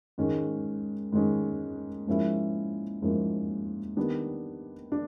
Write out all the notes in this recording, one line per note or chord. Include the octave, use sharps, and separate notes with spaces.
G#2 D#3 G#3 C#4
G#2 D#3 G#3 C#4
G#2 F3 A#3 C#4 E4
G#2 F3 A#3 C#4 E4
D#3 G3 B3 D4
D4